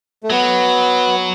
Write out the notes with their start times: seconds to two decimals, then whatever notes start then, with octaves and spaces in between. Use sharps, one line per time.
0.23 A3
0.30 F#3 B3